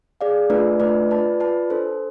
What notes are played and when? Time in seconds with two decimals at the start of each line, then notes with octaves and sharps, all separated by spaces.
0.21 G#4 D5 F5
0.50 A3 D4 F4 B4 D5
0.79 A3 D4 F4 B4 D5
1.10 F4 B4 D5 A5
1.40 F4 B4 D5 A5
1.70 D4 A4 C5